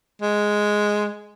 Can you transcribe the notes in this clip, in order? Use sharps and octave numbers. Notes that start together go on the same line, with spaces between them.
G#3